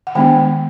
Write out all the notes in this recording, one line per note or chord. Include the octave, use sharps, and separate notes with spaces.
F#5
D#3 G#3 B3 D4 G5